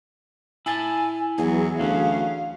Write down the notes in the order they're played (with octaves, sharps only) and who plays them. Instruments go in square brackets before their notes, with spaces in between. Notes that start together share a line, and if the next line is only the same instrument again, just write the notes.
[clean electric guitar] E4 A5 [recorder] G#5
[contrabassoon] E2 [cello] E3 F#3 [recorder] G#4
[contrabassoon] D2 [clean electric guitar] F#3 C#4 [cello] F5